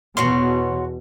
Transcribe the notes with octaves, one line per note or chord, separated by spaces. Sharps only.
E2 B2 F#4 C#5 C6